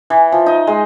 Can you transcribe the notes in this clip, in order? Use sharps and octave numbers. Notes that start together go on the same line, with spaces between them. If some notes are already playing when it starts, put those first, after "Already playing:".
E3
F3
D#4
G#3